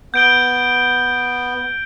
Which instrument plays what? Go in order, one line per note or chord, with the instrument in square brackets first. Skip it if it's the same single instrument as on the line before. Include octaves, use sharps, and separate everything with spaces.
[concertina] B3 [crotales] G6 D7 G7